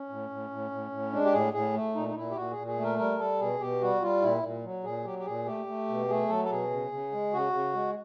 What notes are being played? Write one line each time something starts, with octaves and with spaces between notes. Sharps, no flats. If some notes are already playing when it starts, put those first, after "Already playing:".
Already playing: C#4
A2
A2
A2
A2
A2
G#3 D4
G4
A2 G#4
A2 G#4
A3
A#2 D#4
D#4
A#2 E4
G4
A#2 F#4
G#4
A#2
G#4
A3
A#4
G3 A#4
G3 A4
B2 G#4
B2 G4
G3 F#4
G3 F4
A#2 E4
A#2
F#3
A#2 G#4
F#3 G4
G4
A#2 G#4
A3 G4
A3
B2
A3 G#4
F#3 A4
A4
B2 G#4
C#3
C#3
G#3
C#3 F#4
C#3
G#3